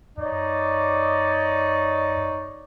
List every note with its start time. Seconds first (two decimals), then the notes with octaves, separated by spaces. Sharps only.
0.18 F#2 D#4 C#5 D5